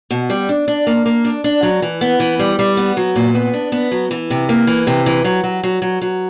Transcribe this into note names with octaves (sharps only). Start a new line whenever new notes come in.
B2
G3
D4
D4
A#3
A#3
D4
D4
F#3
E3
B3
E3
G3
G3
B3
F#3
A#2
B3
D4
B3
F#3
E3
C3
A#3
E3
C3
E3
F#3
F#3
F#3
F#3
F#3